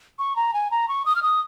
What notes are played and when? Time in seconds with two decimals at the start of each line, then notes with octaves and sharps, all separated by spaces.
0.19 C#6
0.36 A#5
0.54 G#5
0.71 A#5
0.89 C#6
1.06 D#6
1.16 F6
1.22 D#6